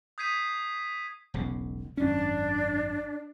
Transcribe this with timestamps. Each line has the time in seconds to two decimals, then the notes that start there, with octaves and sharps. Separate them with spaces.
0.18 D#6 G6 G#6 B6 C7 D#7
1.34 E1 B1 C#3
1.97 G#1 F#2 C#4 D4